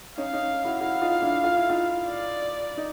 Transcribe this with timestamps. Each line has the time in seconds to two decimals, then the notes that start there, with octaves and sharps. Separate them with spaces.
0.17 C#4 D#4 F5
0.33 C#4 D#4
0.65 E4 F#4
0.80 E4 F#4 F5
1.02 D#4 F4
1.22 D4 E4
1.44 F4
1.57 E4
1.70 D#4 F4
2.07 D5
2.77 D#4